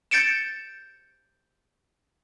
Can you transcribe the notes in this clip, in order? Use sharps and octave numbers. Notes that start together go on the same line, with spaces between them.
G6 A6 C#7 D7 E7